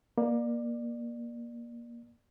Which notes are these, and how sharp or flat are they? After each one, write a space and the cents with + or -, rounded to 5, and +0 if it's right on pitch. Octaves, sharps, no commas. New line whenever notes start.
A#3 +20 D5 +25